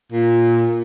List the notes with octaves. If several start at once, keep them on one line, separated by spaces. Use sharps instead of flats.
A#2